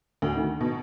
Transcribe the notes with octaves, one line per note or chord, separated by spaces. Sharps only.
D2
D#3
B2